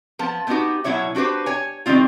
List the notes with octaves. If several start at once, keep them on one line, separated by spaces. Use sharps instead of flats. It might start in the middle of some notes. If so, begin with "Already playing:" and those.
F3 B3 A5
A3 B3 C4 D#4 F#4 G4
B2 F#3 E4 C#5 E5
D4 F#4 G4 B4 C5
C#5 G#5
D#3 G3 G#3 C4 F4